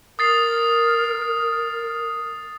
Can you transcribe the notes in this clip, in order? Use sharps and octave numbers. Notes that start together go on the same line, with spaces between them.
A#4 D#6 A6 C7